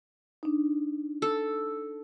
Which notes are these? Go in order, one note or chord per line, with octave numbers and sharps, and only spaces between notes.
D4 D#4
A4